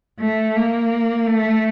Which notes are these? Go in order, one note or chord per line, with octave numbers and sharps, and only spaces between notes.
A3
A#3
A3